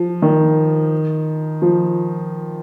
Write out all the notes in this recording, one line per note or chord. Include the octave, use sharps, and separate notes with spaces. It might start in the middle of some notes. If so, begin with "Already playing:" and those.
Already playing: F3
D#3
F3